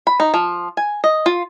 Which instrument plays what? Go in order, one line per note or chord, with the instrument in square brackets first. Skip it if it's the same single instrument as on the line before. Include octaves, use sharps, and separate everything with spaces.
[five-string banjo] B5
D#4
F3
G#5
D#5
F4